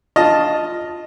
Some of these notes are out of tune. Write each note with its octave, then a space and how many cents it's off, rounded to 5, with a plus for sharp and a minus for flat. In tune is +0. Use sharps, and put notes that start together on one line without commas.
F4 +0 D#5 +0 A5 +0